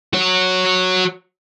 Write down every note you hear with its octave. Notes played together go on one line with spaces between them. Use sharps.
F#4 C#5